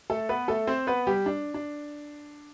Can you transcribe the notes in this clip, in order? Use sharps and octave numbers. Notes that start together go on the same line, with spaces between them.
A3 A4
B3 B4
A3 A4
C4 C5
B3 B4
G3 G4
D4
D4